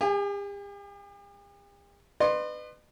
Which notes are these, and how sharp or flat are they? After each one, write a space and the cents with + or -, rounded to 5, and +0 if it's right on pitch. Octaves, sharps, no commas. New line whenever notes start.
G4 +45 G#5 +0
B4 +20 D#5 -45 C6 +15